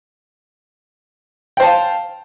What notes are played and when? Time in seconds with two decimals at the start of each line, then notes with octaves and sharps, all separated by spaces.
1.57 G5
1.60 C5
1.62 A5
1.65 F5